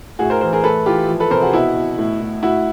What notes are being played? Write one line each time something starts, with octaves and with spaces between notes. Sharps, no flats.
A2 F#4 G#4
A#4 C5
E3 A#4 C5
G#4 A#4
A2 A4 B4
E3 F4 G4
F3
A4 B4
C3 A#4 C5
F#4 G#4
B2 E4 F#4
B2
A2
A2
A2 E4 F#4